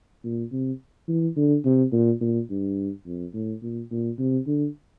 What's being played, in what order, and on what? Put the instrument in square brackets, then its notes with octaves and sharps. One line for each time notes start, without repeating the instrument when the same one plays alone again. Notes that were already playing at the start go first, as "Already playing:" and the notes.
[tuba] A#2
C3
E3
D3
C3
A#2
A#2
G2
F2
A2
A#2
A#2
C3
D3